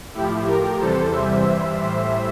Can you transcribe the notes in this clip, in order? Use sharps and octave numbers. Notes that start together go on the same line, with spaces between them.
A2 F3 E4 G4
A2 F3 G4 A#4
E2 C3 E3 G3 A4 C5
E2 C3 E3 G3 C5 E5
G2 E3 G3
A2 E3 G3